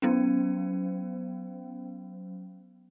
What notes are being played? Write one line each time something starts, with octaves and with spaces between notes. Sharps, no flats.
F#3 B3 C#4